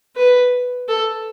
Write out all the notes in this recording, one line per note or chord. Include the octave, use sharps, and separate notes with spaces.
B4
A4